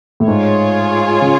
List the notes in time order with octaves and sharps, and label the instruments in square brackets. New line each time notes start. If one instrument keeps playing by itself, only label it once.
[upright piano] A2
[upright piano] G#2 [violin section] F4 G#4 C#5
[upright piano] C#3